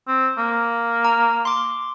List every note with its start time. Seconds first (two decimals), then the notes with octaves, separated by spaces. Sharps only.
0.08 C4
0.38 A#3
1.05 A#5
1.45 C6 D6